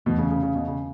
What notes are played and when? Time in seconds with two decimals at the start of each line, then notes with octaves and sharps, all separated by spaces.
0.06 E2 B2 E3 A3
0.18 C#3
0.31 C#3
0.43 C#3
0.55 B2
0.68 C#3